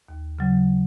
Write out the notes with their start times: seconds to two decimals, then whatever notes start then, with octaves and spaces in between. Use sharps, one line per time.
0.09 D#2
0.39 C#3 F#3